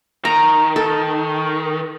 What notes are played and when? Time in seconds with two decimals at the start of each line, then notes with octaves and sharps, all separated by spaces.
0.25 D#3 A#5
0.76 A4